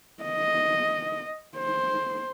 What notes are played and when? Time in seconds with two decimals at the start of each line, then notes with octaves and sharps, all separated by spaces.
0.24 D#5
1.57 C5